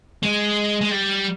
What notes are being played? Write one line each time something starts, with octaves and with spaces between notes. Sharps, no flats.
G#3
G#3
G3